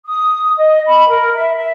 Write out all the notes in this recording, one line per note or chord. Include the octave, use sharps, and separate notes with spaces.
D#6
D#5
B5
A#4
E5
E5